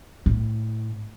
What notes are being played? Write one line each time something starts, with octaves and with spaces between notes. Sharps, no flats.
A2